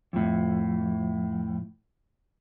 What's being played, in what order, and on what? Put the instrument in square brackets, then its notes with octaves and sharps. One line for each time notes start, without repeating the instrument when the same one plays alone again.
[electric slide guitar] F2 A2